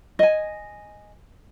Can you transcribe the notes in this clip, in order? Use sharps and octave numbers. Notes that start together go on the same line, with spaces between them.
D#5 G#5